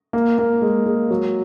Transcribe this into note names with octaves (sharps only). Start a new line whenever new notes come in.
A#3
A#3
G#3
G#3
F#3